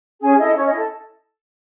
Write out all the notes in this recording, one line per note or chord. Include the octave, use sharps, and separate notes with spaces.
C#4 G#4 G#5
E4 A4 D#5
C#4 C#5
D#5
E4
A4